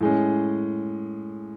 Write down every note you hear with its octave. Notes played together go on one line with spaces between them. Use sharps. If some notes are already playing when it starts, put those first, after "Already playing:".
A2 G#3 C#4